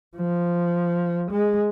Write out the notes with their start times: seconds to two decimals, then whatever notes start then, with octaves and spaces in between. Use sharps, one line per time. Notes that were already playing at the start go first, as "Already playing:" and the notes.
0.17 F3
1.31 G#3